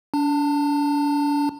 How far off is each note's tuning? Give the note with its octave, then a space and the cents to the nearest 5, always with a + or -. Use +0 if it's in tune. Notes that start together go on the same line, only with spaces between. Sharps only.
D4 -35 A5 +30